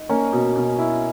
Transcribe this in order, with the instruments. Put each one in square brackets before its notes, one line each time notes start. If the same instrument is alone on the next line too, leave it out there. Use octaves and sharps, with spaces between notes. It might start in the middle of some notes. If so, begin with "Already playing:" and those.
Already playing: [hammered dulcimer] D#4
[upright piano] A#3 [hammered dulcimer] C#4
[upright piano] B2
B2
E4